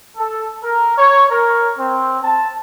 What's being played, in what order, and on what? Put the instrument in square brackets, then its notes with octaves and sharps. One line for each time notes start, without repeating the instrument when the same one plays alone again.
[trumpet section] A4
A#4
C#5
A#4
C4
A5